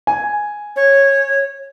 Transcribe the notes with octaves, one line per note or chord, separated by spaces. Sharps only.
G#5
C#5